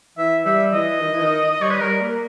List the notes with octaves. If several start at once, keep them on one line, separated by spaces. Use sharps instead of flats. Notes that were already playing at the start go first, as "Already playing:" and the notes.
E3 E5
G3 E5
E3 D#5
D#3
E3
D#3
D#5
G3 C#5
B4
G3 A#4
A#3